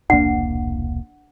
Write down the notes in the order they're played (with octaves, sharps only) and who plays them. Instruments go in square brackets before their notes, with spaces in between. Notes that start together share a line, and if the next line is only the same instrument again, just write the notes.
[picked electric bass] E1 C2 A#3 [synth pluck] D4 [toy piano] F#5